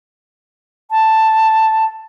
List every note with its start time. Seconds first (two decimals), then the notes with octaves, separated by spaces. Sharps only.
0.91 A5